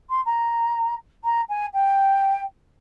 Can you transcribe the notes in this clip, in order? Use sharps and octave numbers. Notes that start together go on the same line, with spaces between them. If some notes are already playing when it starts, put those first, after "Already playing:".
C6
A#5
A#5
G#5
G5